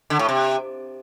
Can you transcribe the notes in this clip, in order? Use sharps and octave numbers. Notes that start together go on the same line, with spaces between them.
D3
A2
C3